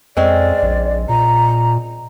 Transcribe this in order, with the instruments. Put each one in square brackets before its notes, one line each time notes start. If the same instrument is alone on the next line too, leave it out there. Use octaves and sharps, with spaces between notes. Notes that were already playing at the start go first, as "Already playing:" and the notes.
[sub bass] F2 [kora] G#3 C4 C#4 [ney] D5
[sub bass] A#1
[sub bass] A#2 [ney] A#5